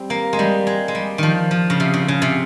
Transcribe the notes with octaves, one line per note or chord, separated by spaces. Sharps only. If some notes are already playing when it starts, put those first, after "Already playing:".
Already playing: G3 C4
A#3
G#3
G3
G#3
G#3
G3
D#3 F3
F3
C#3
C3
C#3
C#3
C3